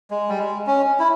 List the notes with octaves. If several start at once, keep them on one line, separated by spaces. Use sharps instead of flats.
G#3
G3
G#3
C#4
E4